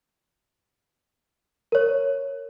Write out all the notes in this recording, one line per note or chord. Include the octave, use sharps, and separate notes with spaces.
A#4 C#5